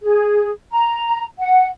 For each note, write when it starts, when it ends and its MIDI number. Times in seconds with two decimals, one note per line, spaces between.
0.03 0.51 68
0.72 1.24 82
1.39 1.66 78